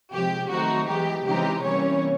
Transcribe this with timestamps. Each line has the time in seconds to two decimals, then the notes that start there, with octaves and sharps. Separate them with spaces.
0.12 C3 F3 G#3 G4
0.50 D#3 F#3 A3 C4 D#4 F#4
0.87 E3 G#3 B3 G4
1.26 C#3 E3 G#3 C4 D#4 G4
1.63 C3 E3 G3 A#3 C#4 C#5